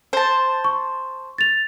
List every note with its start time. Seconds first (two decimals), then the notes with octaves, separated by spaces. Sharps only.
0.13 C5 A5
0.64 C#6
1.38 A6 F7